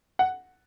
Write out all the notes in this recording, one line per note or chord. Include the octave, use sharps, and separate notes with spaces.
F#5